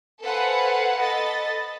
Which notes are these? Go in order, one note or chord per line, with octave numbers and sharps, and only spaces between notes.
A4 B4 C5 F5 F#5 G#5
A4 D#5 B5 A6